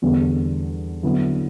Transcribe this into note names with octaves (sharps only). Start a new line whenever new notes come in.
E2 D3 G3 B3
D3 F#3 B3 E4